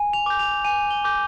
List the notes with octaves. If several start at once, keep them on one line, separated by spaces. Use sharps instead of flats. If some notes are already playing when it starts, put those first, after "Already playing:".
Already playing: G#5
F7
D6 G6
F7
G#5 D#7
G7
D6 G6